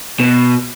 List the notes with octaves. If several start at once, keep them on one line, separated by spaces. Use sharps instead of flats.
B2